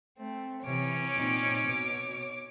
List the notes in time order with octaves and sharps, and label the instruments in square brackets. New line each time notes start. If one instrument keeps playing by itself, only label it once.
[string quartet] A3 C4
[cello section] C3 E3 [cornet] C#4 [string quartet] C#5 D6
[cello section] A#2 C4 D#4
B2